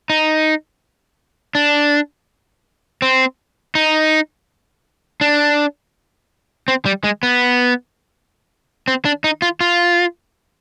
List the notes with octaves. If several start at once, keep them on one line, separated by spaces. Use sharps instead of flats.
D#4
D4
C4
D#4
D4
C4
G3
G#3
B3
C4
D4
D#4
F4
F4